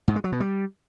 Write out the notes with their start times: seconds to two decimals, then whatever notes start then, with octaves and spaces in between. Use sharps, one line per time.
0.08 G#2
0.16 G#3
0.24 F#3
0.32 B2
0.40 G3